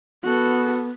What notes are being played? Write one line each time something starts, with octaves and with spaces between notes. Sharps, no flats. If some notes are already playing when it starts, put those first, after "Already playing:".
B3 F#4 A4